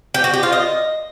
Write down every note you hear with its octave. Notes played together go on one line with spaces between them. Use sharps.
G4
F#4
G4
F4
D#5